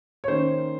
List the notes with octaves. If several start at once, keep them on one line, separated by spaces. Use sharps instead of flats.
C#5
D#3 A#3 C#4 C5